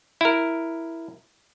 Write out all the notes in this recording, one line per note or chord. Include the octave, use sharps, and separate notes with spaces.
E4 A#4